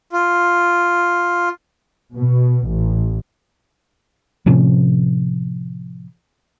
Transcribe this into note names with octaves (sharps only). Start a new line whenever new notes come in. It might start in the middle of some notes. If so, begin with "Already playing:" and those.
F4
B2
A1
A2 C3 F3 C#4